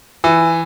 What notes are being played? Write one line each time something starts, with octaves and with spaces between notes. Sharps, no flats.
E3